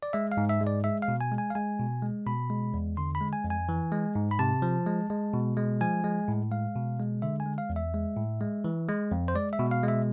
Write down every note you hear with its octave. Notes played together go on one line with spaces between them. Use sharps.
D5
G#3 E5
F5
G#2
E5
G#3
D5
G#3 E5
F5
B2
G#5
G#3
G#5
F5
G#3 G#5
B2
G#3
B2 B5
G#3
E2
D3 C6
B5
G#3
G#5
F2
G#5
E3
G#3
G#2
B5
C3 A5
F3
G#3
G#3
B2
G#3
F3 G#5
G#3
A2
G#3 F5
B2
G#3
D3 E5
G#5
G#3
F5
E2
E5
G#3
A2
G#3
E3
G#3
F2
C5
G#3 D5
E5
B2
F5
G#3
E5